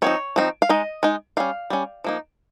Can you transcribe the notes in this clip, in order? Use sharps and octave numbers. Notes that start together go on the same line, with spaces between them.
F3 C4 D#4 C#5
F3 C4 D#4
F5
G#3 D#4 D#5
G#3 D#4
G3 C#4 F5
G3 C#4
F3 A#3 D#4